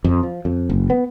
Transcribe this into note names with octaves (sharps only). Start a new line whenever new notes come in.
F2
F3
F2
F#1
B3